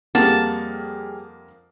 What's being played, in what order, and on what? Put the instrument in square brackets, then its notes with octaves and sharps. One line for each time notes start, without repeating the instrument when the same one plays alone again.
[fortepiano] F2 A#3 F#5 [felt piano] G3 G4 G#4 [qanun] A5